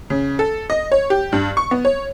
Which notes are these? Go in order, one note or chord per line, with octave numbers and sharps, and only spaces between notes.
C#3
A4
D#5
C#5
G4
G2
C#6
B3
C#5